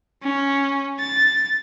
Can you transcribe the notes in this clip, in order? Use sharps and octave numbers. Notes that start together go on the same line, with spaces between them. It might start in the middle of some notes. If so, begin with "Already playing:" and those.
C#4
A6